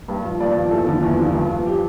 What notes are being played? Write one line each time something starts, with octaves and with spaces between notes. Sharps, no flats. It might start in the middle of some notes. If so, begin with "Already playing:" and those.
G2
F3
G2 D5
F3
E2 A4
D3 F3
E2
D3 F3
G2
F3
G4